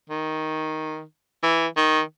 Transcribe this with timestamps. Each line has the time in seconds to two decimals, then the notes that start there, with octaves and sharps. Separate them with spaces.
0.09 D#3
1.43 E3
1.77 D#3